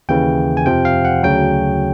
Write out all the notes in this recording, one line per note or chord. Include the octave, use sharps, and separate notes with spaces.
D#2 C#3 E3 G5
G#5
F2 C3 F3 G5
F5
F#5
D2 C#3 F#3 G5